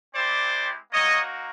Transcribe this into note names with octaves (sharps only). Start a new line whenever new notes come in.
G#3 C4 E4 G4 C5 D5
A#3 D#4 F#4 C#5 D#5